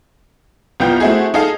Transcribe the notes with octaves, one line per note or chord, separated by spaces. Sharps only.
C2 B3 F4 G5 G6
A3 C4 E4 F#4 G#4
D#4 G#4 A4 D#5 F5